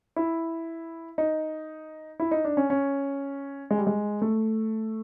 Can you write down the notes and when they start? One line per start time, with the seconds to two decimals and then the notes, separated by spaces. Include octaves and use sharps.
0.16 E4
1.18 D#4
2.20 E4
2.31 D#4
2.45 D4
2.57 C#4
2.70 C#4
3.71 G#3
3.78 G3
3.87 G#3
4.22 A3